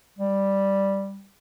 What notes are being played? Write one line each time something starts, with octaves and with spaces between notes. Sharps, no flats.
G3